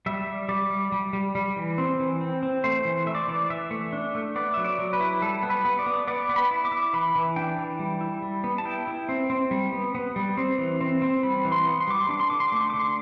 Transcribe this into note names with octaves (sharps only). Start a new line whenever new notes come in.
G3 E5
G3
G3 D5
G3
G3
G3
G3
E3
C4
E3
C4
C4
A3 C5
E3
A3 E5
D5
C5
E3 D5
E3 E5
A3
D4
A3
B3 D5
F#3 E5
D5
F#3
B4
E4
G3 A4
B3
B4
B3
D5
B3
B3 D5
B3
B5
E4
D6
E4
E3 B5
E3
D4 G5
E3
G3
E4
G3
B3
A5
E4 G5
E4
C4
C4
G3
B3
B3
G3
C4
E3
C4
C4
G3 B5
E3
C6
B3
C6
G3 D6
C6
D4 D6
C6
D3 D6
C6
A3 D6
C6
D3 D6
C6